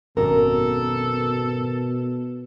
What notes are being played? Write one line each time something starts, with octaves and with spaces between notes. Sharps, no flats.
G#1 F#2 B2 A4 A#4